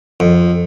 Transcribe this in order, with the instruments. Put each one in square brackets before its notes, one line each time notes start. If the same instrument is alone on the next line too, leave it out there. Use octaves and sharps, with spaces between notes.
[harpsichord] F2